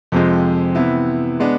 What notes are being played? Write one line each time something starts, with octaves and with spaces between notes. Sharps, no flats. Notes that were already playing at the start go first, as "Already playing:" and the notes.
F2 C3 F3 G#3
C3 E3 B3 E4
G#3 B3 D4